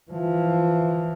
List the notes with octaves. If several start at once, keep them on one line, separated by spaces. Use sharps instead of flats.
E3 F3